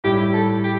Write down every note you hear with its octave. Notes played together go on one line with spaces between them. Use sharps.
A2 G3 E4 G4
A4
G4